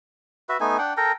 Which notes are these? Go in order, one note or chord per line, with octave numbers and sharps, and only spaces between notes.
F#4 B4 E5
A3 B3 D#4 G#5
D4 F#5 G5
A4 A#4 G5 A#5